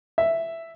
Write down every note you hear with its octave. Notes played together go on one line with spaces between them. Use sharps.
E5